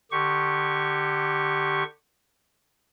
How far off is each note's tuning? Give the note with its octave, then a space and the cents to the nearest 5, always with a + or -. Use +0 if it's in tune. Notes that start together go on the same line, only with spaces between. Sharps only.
D3 +30 G4 +0 C#6 +0